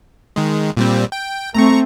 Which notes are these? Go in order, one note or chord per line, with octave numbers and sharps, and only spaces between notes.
D#3 G#3
A#2 G3 C4
G5
A3 C4 A#5 C#6